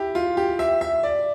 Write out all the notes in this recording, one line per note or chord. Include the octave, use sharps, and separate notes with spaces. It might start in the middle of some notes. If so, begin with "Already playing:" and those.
Already playing: E4 G4
F4
G4
E5
E5
D5